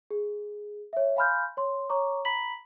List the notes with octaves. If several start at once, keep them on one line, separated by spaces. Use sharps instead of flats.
G#4
C#5 E5
F5 G#5 B5 C6 F6 G6
C#5 C6
C#5 A#5 C#6 D6
A#5 B5 B6 F#7